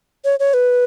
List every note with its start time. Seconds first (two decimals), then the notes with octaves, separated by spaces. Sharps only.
0.25 C#5
0.40 C#5
0.54 B4